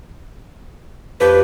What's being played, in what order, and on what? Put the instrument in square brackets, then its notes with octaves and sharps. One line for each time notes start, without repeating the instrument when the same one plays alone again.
[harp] F2 G4 G6 [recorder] B4